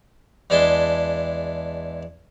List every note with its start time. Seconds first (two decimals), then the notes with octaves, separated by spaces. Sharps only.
0.50 E2 G#3 D4 E4 A5 C6